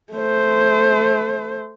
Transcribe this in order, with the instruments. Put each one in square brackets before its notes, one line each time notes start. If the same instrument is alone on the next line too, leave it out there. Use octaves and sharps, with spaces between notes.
[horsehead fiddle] A3 C5